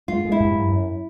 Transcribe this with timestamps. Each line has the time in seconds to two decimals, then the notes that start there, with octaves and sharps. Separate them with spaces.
0.08 G#3 F4
0.25 G#3
0.32 E4
0.40 G2
0.55 F#2
0.71 F#2